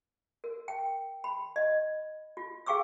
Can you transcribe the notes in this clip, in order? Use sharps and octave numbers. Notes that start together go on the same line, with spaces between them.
A#4
G5
B5
D#5
F4
G#4 F5 G5 C#6 D6 E6